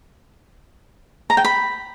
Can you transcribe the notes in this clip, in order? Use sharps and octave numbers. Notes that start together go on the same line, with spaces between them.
A#5
G5
B5